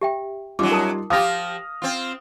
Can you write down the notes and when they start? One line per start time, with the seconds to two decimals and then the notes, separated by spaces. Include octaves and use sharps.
0.01 G4 E5 G5
0.59 F#2 F#3 G3 D#4 F4 D6
0.72 A#4 A5 D#6
1.10 F3 F4 G4 F5 D#6 F6 A#6
1.82 C4 F4